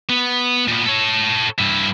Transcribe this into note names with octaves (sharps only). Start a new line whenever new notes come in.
B3
A#2 B3
A4 C#5
G2 E4